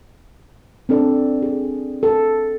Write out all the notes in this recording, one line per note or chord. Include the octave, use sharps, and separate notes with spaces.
C4 D4 A4 D5
G#4
A4